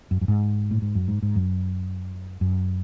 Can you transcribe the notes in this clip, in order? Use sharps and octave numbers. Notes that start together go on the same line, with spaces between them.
F#2
F#2
G#2
A2
G#2
F#2
G#2
G#2
F#2
F#2